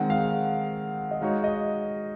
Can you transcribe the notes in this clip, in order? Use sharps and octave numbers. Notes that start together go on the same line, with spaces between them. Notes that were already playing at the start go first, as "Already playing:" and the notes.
Already playing: D#3 G#3 C4 F#5
F5
D#5
G#3 D#4 F#4 C#5 F5
D#5